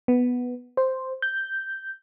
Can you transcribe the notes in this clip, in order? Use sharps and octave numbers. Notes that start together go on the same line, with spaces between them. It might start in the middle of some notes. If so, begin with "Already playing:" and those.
B3
C5
G6